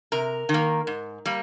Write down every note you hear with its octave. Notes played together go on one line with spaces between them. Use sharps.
C3 A#4
D#3
A#3
G#2
G3 A#3